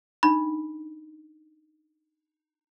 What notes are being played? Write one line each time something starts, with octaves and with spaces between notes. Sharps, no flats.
D4 D#4 B5